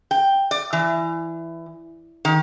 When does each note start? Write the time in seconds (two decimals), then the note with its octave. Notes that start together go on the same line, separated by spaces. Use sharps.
0.11 G5
0.51 D5
0.73 E3
2.25 D#3